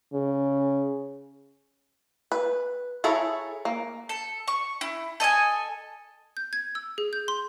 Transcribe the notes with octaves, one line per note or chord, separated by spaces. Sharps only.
C#3
B4
E4 G#4 A4 C#5 A#5
A#3
A4
C#6
E4
A4 D#5 E5 G#5
G6
G#6
E6
G#4
G6
C6